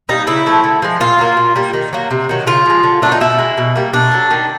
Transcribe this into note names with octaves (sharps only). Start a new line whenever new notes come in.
G3 A#3 D#4
C#3 E4
F3 A3
D3
F3 G#3
A#2 F4
F#3 A#3
A#2
G3 A#3
D#3
F#3 A#3
C3
D#3 F#3
C#3 F4
F3 G#3
D3
F#3 A3 D4
D#4
B2 E4
G#3
B2
G3 A#3
B2 D4
F#3 A3
D#3